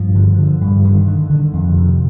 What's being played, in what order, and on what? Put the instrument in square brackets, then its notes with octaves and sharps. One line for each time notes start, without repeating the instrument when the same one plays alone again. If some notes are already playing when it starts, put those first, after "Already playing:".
Already playing: [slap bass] G2 F3
D3
D3
G2
D3 D#3
D3
D3
F2
C3